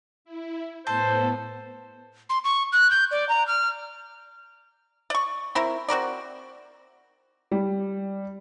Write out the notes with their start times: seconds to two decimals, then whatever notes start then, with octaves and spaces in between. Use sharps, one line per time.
0.25 E4
0.87 A2 B3 A4 C5
2.30 C6
2.44 C#6
2.72 F#6
2.91 G6
3.11 D5
3.29 A#5
3.47 F6
5.10 D5 C#6
5.55 C4 E4 A#4
5.88 C4 F#4 A#4 D5
7.51 G3